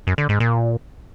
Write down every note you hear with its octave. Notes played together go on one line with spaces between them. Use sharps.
F#2
D3
G#2
A#2